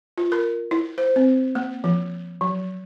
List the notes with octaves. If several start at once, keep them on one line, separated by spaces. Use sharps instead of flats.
F4
A#4
E4
C5
C4
A#3
F3
F#3